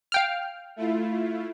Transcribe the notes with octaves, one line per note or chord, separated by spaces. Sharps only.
F5 G5 F6
A3 E4 F4